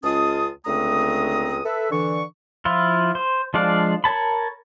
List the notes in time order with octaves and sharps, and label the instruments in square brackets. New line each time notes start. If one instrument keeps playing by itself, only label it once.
[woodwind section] C#2 G#3 C#4 F4 A5 D#6
C#2 D3 A3 C4 A#5 D#6
A4 B4 E5
D3 E3 C#6
[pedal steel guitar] F3 E4 F4
C5
F3 G#3 D4 D5 F5
A#4 C#5 A5 B5